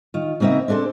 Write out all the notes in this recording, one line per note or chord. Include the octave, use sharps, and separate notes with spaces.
D#3 F4
C#3 A#3 C4 D#4 E5
C4 D4 G#4 A4 C5